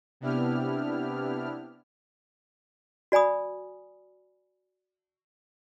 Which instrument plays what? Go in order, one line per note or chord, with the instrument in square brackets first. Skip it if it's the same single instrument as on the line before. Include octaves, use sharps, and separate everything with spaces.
[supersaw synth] C3 B3 D4 E4 G4 F6
[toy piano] F#4 D5 G#5 B5 D#6